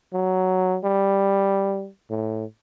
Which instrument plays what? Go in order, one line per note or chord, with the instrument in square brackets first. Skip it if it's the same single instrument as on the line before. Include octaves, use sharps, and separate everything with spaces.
[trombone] F#3
G3
A2